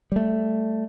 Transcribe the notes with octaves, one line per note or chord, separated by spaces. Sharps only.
G3 A3